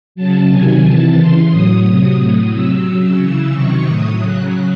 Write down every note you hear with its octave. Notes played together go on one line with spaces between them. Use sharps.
C#3 F#3 A5
C3 D#3 F#3 G#5
C3 E3 A5
C#3 E3 C6
A2 F#3 D#6
C3 F#3
A2 F#3 D#6
C3 F#3 E6
C#3 F#3
C#3 E3
C3 D#3 F#3 C#6
A2 F#3 D#6
C#3 F#3 F#6